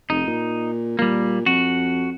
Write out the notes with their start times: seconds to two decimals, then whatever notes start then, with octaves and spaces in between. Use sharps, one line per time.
0.10 F1 D#4
0.27 A#2
0.99 A#2 G3 A#3
1.46 F2 F#4